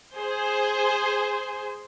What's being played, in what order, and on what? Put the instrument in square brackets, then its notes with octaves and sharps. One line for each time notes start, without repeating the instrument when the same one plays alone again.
[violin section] G#4 C5